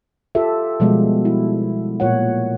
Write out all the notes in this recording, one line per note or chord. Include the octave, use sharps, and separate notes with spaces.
F4 G4 A4 E5
B2 F3 G3 G#3 B3
E4
A#2 C#5 F#5